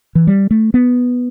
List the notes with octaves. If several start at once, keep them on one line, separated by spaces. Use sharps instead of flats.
E3
G3
A3
B3